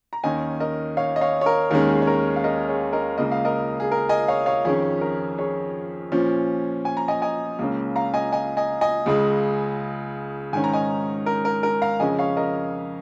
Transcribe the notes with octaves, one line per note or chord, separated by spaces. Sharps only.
A#5
D#2 D#3 C#4 D#5 G#5
A#4 D#5
C#5 F5
D#5
C#5 F5
C#5
A#4
D#2 D#3 G#3 C#4 A#4
G#4
C#5
A#4
F5
A#4 D#5
G#4 C#5
A#4 D#5
C#2 C#3 A#3 D#5
F5
A#4 D#5
G#4
A#4
D#5 G#5
C#5 F5
C#5 F5
F2 D#3 C#4 G#4 C#5
A#4
G#4 C#5
A#2 F3 C#4
G#5
A#5
D#5 G#5
D#5 G#5
C#2 C#3 A#3 C#4
F5 A#5
D#5 G#5
D#5 G#5
D#5 G#5
D#5 G#5
C#2 C#3 G#3
G#2 D#3 C#4 G#5
A#5
D#5 G#5
A#4
A#4
A#4
F5 A#5
F2 C#3 G#3 C#4 D#5 G#5
C#5 F5
A#4 D#5